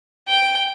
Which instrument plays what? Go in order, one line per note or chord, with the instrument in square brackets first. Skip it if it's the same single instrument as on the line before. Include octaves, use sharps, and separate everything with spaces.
[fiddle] G5